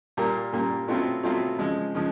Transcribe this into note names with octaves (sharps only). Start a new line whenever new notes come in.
A#2 G3 A#3
A#2 G3 A#3
B2 F#3 A3 C4 F4
B2 F#3 A3 C4 F4
C#3 F3 G#3
C#3 F3 G#3